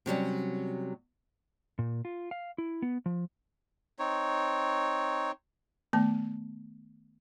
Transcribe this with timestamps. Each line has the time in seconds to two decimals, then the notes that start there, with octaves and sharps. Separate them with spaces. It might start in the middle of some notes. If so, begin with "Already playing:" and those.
0.06 C3 F#3 G3 C#4
1.79 A#2
2.05 F4
2.31 F5
2.58 E4
2.82 B3
3.06 F3
3.99 C4 D#4 C#5
5.93 D#3 A3 B3 A5